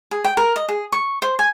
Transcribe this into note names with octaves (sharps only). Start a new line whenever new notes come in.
G#4
G5
A#4
D#5
G#4
C#6
C5
G#5